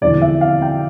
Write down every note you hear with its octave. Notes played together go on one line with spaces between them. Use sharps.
E1 E2 D3 F3 D5
E5
F5
G5